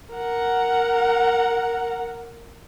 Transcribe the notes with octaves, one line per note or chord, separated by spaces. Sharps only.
A#4 F#5